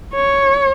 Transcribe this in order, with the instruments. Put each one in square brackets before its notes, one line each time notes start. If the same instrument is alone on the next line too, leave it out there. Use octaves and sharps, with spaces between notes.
[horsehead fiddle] C#5